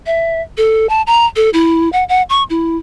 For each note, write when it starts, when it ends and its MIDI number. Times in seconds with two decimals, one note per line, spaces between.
0.06 0.41 76
0.58 0.87 69
0.89 1.02 81
1.07 1.26 82
1.36 1.50 69
1.53 1.91 64
1.92 2.04 78
2.09 2.22 78
2.30 2.43 85
2.50 2.77 64